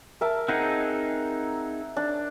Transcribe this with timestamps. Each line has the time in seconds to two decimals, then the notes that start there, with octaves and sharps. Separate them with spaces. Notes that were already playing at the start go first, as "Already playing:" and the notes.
0.21 A#4 E5 A5
0.48 C4 D#4 G#4 F#5
1.96 D4